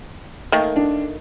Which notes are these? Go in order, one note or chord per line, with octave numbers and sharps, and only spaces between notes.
D#3 A3 A#3
D4